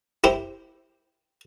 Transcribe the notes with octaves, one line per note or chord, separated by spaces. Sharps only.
E4 G4 C5